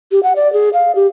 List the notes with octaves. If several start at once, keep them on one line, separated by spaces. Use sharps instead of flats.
G4
F#5
D5
G#4
F5
G4